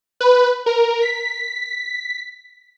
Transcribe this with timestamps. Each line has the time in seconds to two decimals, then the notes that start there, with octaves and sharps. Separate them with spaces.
0.21 B4
0.66 A#4
1.02 B6